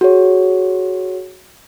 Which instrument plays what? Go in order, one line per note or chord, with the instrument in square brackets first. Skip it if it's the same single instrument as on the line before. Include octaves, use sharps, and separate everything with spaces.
[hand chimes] F#4 G#4 C#5